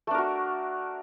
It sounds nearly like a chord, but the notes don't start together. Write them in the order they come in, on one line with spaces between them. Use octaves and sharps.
A3 D4 A#4 F#4